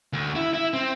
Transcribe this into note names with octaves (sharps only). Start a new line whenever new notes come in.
D2
E4
E4
C4